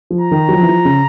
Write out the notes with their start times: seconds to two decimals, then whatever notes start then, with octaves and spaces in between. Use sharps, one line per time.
0.10 F3
0.21 A#5
0.31 D#3
0.49 F#3
0.53 F3
0.63 E3
0.69 F3
0.85 C#3